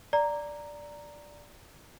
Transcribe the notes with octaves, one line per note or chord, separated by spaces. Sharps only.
D5 A#5